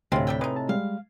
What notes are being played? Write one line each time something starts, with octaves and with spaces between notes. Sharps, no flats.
D2 A2 C3 G#3 C4 F4
G3 E5 G5
G#3 D#4 B4 D#6
A5
G3 G#3 F5